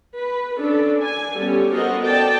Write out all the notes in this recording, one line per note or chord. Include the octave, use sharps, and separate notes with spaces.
B4
C#4 D4 A4
G#5
G3 B3 C#4 G4 A4
B3 F#4 A4 A#4 C5 D#5
D5 G5 A5